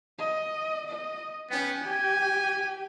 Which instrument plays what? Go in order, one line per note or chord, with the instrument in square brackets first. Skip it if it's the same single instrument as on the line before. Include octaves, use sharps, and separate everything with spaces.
[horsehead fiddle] D#5
D#5
[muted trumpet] B3 [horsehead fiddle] C#4 G5
[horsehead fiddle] G4 G5 [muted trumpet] G#5